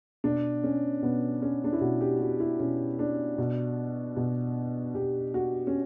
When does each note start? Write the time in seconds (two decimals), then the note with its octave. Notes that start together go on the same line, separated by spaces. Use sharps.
0.24 B2 D4
0.64 C#4
1.02 B2 B3
1.42 C#4
1.64 D4
1.72 E4
1.81 B2 F#4
2.01 G4
2.20 F#4
2.40 E4
2.59 B2 C#4
2.99 D4
3.38 B2
4.16 B2
4.95 B2 G4
5.34 F#4
5.67 C#4